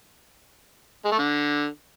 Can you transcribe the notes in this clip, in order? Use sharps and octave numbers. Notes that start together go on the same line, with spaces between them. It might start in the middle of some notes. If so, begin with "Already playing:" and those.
G#3
A3
D3